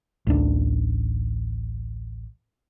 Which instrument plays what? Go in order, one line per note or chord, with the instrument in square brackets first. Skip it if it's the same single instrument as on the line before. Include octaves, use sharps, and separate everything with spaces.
[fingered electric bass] A1 D2 D4